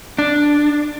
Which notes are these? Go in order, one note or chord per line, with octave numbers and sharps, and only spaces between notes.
D4